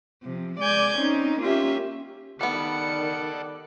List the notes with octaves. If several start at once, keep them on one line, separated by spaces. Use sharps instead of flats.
C3 F3
G#3 D5 G#5 G6 G#6
C4 C#4 D#4
A#3 C#4 F4 G4 E5
D#3 G3 B3 A4 D5 F#5 C#7